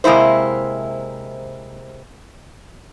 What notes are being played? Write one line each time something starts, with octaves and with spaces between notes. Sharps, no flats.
C3 G#3 A#3 E4 C5